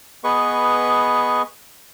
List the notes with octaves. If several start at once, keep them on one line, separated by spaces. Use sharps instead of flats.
B3 G#4 B4 D#5 C#6